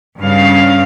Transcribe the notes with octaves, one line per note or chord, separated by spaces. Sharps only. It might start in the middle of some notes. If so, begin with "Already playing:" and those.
G2 C#3 F5